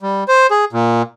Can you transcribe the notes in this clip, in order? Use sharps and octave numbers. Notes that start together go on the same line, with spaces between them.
G3
C5
G#4
A#2